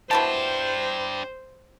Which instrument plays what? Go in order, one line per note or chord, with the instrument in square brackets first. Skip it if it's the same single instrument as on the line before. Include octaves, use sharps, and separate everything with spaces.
[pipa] B2 E3 A5 [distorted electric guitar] D4 G4 [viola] C5